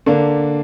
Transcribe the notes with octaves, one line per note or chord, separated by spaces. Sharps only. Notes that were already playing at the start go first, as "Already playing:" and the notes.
D3 A#3 D4